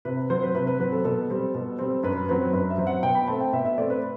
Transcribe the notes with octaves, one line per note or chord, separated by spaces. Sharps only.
C3 B4
F#3 C4 C5
B4
C3 B4
B4
F#3 C4 B4
A4
B2 A4
G3 C4
B2
G3 C4
F#2 B4
F#3 C4 B4
F#2 B4
E5
F#3 C4
F#5
B2 G5
B5
A3 C4 A5
G5
B2 E5
E5
A3 C4 D5
B4